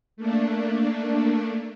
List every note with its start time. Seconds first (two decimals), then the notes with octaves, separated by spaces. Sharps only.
0.17 A3 A#3 D4